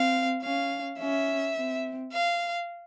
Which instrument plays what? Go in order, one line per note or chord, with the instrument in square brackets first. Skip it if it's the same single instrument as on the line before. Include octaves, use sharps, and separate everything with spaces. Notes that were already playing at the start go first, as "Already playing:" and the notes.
Already playing: [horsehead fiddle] C4 [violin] F5
[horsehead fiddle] C#4 [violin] F5
[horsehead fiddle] C#4 [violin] E5
[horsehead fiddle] C4
[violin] F5